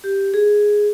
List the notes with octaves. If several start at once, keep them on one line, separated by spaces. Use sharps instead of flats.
G4
G#4